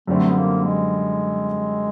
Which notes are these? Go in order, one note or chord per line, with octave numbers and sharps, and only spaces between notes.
F#2 D3 G3 A3 C4
B3
A#3
G#3